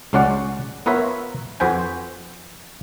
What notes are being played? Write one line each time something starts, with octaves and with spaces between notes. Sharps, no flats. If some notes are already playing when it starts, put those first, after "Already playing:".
C#2 G#3 C#4 F#4 D5 F#5
B3 F4 A#4 B4 C#5 E5
F2 F#4 B4 C5 G5 G#5